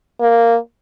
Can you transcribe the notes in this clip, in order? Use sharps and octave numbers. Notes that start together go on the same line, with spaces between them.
A#3